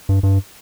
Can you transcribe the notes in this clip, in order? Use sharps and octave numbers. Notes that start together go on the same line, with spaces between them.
G2
G2